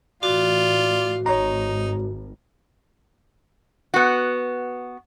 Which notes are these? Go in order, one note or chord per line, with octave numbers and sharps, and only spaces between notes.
A2 E3 F4 F#4 D5
G#1 D#4 C#5 A#5
B3 F#4